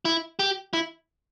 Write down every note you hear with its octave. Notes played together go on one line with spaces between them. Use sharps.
E4
G4
E4